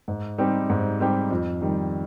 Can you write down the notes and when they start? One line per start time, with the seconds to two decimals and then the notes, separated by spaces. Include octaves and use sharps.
0.08 G#2
0.38 G3 C4 D#4 G4
0.70 G#2
1.00 G3 C4 D#4 G4
1.31 F2
1.61 D#3 G3